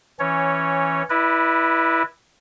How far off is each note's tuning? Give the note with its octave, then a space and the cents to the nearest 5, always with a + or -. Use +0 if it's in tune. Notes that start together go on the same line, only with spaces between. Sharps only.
E3 +0 C#4 -10 C#5 +0
E4 +0 B4 -20 D5 +45